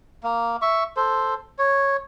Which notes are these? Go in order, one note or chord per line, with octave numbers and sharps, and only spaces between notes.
A#3
E5 C#6
A4 C5
C#5